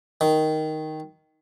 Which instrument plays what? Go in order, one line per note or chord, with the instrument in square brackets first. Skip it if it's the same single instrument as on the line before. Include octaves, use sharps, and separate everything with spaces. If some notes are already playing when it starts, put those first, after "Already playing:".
[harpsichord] D#3